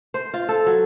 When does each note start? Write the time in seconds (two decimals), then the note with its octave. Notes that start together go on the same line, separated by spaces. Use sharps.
0.14 C5
0.34 F4
0.49 A4
0.66 F#3